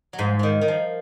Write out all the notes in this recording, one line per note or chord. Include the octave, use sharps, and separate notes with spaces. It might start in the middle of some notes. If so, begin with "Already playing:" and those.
F#3
G#2 F3
D#3 F3
D#3
F3